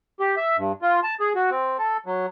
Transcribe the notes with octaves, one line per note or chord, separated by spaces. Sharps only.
G4
E5
G2
F4
A5
G#4
F#4
C4
A4
F#3